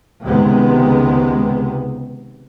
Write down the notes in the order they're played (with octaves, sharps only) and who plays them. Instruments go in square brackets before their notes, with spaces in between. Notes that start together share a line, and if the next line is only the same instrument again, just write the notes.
[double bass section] C#2 C3 D#3 G#3 B3